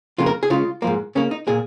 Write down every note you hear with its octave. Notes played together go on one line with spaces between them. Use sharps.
F2 C#3 A#3 F4
A#4
G#4
C#3 G#3 F4
G#2 F3 A#3
C#3 A#3 C#4
D#4
A#2 A#3 G#4